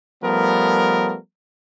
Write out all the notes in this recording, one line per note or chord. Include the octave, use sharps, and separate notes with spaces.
F3 G3 A3 B3 A#4